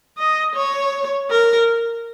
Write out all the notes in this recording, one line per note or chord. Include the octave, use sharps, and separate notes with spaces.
D#5
C#5
A#4